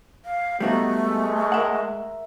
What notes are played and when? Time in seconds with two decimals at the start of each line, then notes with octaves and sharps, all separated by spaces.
0.25 F5
0.60 G3 A3 B3 D#4 F#4
1.05 G#3
1.52 A#4 E5 F#5